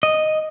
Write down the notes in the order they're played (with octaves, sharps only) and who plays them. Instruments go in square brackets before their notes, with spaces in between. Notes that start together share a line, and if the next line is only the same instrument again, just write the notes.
[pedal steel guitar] D#5